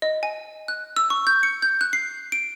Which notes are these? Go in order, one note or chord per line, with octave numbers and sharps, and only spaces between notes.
D#5
G#5
F#6
E6
C#6
G6
C#7
G6
F#6
C7
D7